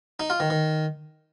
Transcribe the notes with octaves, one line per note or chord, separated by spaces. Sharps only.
D#4
F4
D#3
D#3